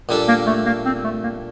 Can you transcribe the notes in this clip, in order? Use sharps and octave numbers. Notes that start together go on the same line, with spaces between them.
A#2 G3 D4 A4
A#3
A3
A#3
C4
A3
A#3